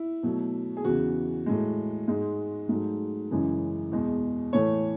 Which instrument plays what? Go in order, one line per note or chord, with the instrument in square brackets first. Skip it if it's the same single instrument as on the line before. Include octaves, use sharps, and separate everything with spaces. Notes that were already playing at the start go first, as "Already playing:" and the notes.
Already playing: [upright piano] E4
B2 F#3 A3
G#4
E2 C#3 E3 F#4
A2 G#3
G#2 G#3
G#2 F#3 A3
F#2 C#3 E3 G#3
E2 B2 G#3
A2 E3 A3 C#5